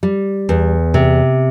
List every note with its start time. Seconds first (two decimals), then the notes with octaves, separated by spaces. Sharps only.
0.03 G3
0.49 E2
0.94 C3